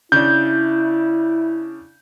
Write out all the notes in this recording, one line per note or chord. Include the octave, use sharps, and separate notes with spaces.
C#3 D4 E4 G6